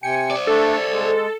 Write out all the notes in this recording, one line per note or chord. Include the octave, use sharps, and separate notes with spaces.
C3 G5 G#5 C#7
C5 D5
A3 D4 A4
G#3